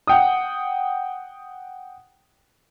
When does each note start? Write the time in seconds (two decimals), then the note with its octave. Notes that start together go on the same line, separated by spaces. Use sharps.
0.07 F#5 G5 D#6